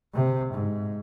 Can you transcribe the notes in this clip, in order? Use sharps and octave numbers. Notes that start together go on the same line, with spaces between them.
C3
G#2